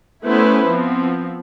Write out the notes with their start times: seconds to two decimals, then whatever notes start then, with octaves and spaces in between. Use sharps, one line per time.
0.24 A3 B3 C#4 E4 B4 C5
0.67 F3 B3 C4